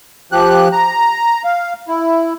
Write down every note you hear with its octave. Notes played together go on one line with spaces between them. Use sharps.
F3 G4 F#6
A#5
F5
E4